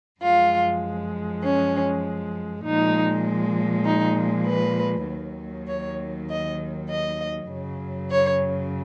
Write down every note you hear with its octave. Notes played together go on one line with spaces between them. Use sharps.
F#2 F3 G#3 F4
C#4
A#2 F3 G#3 D#4
D#4
B4
D#2 D#3 F#3
C#5
D#5
D#5
F#2 C#3 F#3
C#5